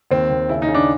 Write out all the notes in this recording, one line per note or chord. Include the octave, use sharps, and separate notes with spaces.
D#2 C4
D#2
C#3 E4
D#4
C#3
D4